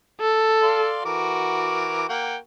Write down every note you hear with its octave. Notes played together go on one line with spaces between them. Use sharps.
A4
D5 F5 C6
E3 F#4 A#4 D6
A#3 F#5 G5